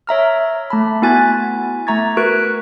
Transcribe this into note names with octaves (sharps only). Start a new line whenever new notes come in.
C#5 E5 A#5 F6
A3 A5 B5
B3 E4 F#4 G#5 F#6 A6
A3 E5 A#5 C#6 G#6 A6
F#4 A#4 B4 C#6 F#6 D7